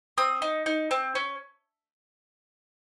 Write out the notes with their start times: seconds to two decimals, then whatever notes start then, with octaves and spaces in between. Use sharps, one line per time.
0.18 C4 D#6
0.42 D#4
0.66 D#4
0.91 C4
1.15 C#4